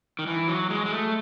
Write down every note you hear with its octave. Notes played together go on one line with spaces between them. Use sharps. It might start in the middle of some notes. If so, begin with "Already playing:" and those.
D#3
E3
F#3
G#3
G#3
A3